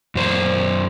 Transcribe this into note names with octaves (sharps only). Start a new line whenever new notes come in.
F#2 C5 D5